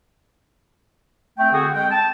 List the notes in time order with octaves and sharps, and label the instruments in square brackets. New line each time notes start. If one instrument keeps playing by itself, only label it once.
[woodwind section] A3 C4 G5
D3 C4 F#4 G#4
G#3 C4 G5
A5